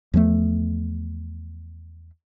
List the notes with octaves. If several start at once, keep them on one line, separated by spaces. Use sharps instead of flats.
E2 F3 F#3 A3